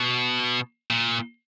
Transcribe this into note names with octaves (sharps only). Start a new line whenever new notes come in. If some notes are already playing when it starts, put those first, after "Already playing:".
Already playing: B2
A#2